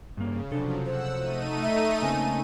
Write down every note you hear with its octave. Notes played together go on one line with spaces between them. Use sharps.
G2 C#3 A#3
C3 F3 F#3 D4 A4
C5 F#5 E6
A3 D#4 D#7
E5
C#3 A#3 C4 G#5